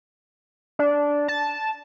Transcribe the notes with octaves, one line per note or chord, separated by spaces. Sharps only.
D4
A5